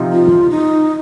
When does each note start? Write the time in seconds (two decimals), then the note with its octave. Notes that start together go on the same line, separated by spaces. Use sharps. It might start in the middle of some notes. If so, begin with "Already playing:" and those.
Already playing: C3 F3 C4 D#4
0.12 F4
0.50 D#4